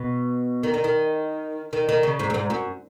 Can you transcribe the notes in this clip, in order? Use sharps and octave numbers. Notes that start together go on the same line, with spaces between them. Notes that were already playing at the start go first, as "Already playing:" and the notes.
Already playing: B2
D#3
D#3
D#3
D#3
D#3
C#3
G#2
F#2
G#2
F#2